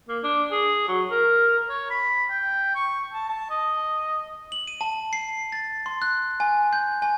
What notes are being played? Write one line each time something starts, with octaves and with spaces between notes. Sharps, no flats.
A#3
D4
G#4
F#3
A#4
C#5
B5
G5
C#6
A5
A5
D#5
F#7
D#7
A5
C7
A6
C6
F#6
G#5
G6
G#5